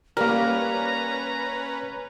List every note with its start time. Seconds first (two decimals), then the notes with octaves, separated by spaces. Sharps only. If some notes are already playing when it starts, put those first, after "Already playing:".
0.17 G3 A#3 C#4 A#4 B4 A#5